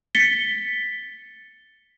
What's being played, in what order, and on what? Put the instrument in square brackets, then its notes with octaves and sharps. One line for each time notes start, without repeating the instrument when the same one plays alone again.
[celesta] A6 B6 C#7 G7